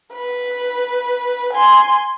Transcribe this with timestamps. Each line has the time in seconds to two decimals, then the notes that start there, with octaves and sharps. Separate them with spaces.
0.12 B4
1.53 G#5 C6